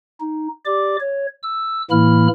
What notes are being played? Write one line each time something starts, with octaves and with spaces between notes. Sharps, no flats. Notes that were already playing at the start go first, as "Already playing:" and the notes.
D#4
G4 D5 D6
C#5
E6
A2 E3 A#3 E4 B5 F6